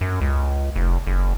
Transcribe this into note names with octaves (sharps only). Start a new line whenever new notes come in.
F#2
C#2
F1
F#1